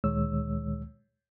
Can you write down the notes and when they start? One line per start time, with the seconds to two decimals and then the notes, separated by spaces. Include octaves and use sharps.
0.04 D2 A#2 D#3 G#3 C#5 E6